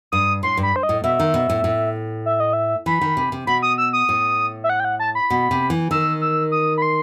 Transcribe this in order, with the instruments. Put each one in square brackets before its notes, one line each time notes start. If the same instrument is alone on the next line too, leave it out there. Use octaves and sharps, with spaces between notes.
[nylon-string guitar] G2 [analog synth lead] D#6
[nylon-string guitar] A2 [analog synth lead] C6
[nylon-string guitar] G2
[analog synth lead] B5
C5
D#5
[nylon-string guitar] A2
[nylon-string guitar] B2 [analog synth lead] E5
[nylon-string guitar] D#3
B2
A2
A2
[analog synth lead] E5
D#5
E5
[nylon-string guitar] E3 [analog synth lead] B5
[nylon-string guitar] D#3
C3
C3
[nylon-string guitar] B2 [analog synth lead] B5
[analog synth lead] D#6
E6
D#6
[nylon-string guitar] A2
[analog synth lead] E5
F#5
G5
F#5
A5
B5
[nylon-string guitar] B2
C3
E3
[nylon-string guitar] D#3 [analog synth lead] E6
[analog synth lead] E6
D#6
B5
C6